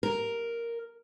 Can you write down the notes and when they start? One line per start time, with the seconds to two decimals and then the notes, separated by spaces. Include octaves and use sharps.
0.03 A#4